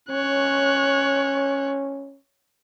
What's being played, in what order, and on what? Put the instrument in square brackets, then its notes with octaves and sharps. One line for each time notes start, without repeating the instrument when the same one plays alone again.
[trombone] C#4 [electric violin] C#5 F#6